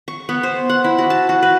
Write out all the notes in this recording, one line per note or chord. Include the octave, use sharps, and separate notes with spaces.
C#6
B3
C5
F#5
E4
F#4
A5
F#4
B4